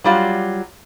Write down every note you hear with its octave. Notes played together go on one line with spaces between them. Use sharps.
F#3 G3 F4